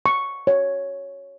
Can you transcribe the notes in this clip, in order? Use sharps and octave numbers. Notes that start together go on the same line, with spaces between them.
C#6
C#5